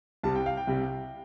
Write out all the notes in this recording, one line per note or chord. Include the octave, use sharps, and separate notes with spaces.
C2 C3 G3 A5
G5
F5
G5
C2 C3 G3